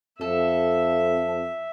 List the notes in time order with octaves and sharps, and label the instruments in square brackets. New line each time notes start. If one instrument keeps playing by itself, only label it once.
[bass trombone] F2 [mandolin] A4 [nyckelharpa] E5